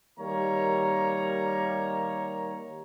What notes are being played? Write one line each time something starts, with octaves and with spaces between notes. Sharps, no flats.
D#3 G3 A#3 A#4 C#5 A#5